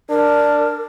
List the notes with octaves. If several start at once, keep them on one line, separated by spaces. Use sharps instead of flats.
D4 A#4